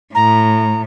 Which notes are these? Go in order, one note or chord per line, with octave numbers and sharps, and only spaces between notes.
A2 A#5